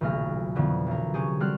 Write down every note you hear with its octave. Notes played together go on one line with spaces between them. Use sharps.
D#1 B1 C#3 A3 F6 A#6
F2 B2 D3 E3 B3
B1 A#4
C3 C#4 G4 G#4
D3 G3 C4 F#4 F6 F#6